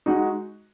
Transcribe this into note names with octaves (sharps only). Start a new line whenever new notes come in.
G#3 D#4 F#4